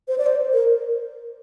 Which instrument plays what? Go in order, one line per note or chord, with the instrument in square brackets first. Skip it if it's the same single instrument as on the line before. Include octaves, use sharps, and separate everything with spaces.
[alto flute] C5
D5
C5
A#4